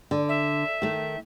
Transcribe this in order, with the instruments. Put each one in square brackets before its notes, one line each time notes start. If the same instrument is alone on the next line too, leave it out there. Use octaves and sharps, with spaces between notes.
[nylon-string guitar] D3
[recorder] E5
[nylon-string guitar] D#3 A3